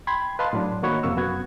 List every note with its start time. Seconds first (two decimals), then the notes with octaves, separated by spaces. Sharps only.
0.07 G5 B5 C6 G#6
0.39 B4 D#5 F5 A5 C6
0.53 A2 F#3 D4
0.83 D#3 A#3 F#4 C#5 D#5 B5
1.03 F2 C3 A#3 F5 C#6 E6
1.16 F#2 B3 F#4 G#6